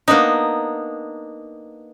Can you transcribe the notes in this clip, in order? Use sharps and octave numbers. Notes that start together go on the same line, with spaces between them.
A#3 B3 D4 D#4